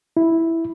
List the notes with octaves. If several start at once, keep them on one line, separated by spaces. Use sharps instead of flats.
E4